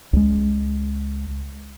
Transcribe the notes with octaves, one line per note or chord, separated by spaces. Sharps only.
C#2 G#3